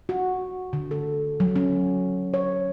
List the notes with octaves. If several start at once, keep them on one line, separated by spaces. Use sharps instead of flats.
F#4
D3
A4
F#3
C#4
C#5